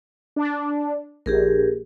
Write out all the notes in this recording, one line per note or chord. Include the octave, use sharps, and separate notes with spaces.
D4
A#1 G4 G#4 A#4